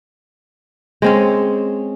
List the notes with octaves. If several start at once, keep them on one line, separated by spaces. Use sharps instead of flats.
G#3 C4 C#4